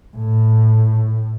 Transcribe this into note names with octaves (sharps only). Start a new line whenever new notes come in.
A2